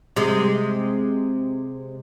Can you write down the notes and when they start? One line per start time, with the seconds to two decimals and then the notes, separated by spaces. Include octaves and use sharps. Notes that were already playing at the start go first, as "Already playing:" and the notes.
0.16 C3 G#3